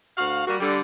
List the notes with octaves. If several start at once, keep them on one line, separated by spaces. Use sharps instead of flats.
D2 F#4 F5
G3 A#3 F#4
D3 G3